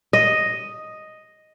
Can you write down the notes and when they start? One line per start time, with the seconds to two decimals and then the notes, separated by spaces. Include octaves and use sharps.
0.13 D#5